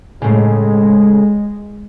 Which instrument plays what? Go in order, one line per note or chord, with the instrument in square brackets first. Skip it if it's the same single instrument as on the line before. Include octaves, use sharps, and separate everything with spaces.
[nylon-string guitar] A2 C#3 [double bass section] G#3